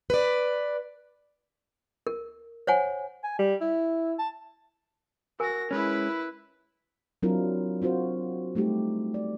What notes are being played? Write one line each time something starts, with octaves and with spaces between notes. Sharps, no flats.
B4 D5
A#4
C5 C#5 F#5 G#5
G#5
G3
E4
A5
F#4 A#4 G#5 A#6
G#3 C#4 E4 B4
F#3 C4 D4 E4 F4 A#4
C4 F4 F#4 C5
G3 A3 D#4 G4
D5